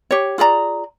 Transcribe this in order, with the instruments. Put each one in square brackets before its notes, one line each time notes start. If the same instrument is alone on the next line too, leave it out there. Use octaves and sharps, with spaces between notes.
[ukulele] G4 C#5
F4 G#4 D5 A#5